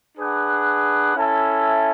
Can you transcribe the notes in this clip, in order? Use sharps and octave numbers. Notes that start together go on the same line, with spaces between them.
D4 G#4 B4 F#5
C#4 E4 A4 E5